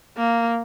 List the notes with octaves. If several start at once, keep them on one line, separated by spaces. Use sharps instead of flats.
A#3